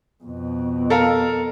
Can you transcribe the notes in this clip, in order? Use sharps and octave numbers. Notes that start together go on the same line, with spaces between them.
F2 B2
A4 A#4 F5